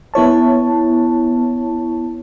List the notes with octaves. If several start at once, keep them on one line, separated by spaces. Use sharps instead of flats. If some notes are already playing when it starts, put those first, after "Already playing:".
B3 E4 C#5 A5